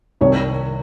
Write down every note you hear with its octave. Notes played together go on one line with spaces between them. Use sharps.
C2 C3 D#3 C#5